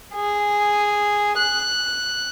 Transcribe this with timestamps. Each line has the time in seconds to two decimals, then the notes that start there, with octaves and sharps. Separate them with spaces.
0.14 G#4
1.38 F#6